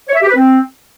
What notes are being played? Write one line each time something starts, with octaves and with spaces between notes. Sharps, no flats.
C#5
E5
G4
B4
C4